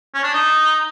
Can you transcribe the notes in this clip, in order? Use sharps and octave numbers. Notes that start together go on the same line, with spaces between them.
C#4
D4
D#4